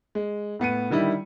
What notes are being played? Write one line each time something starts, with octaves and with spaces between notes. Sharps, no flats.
G#3
A2 B3 C#7 D#7
D3 D#3 G3 E4